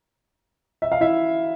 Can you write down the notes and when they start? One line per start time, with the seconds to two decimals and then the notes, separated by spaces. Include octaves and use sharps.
0.82 E5
0.92 F5
1.01 E4 E5